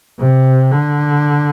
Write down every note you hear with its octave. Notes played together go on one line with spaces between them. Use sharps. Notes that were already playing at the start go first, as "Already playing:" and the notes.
C3
D3